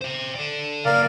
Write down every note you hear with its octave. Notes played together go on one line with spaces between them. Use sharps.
C5 E5
A4 D5
C#3 A#3 A#4 D5 F5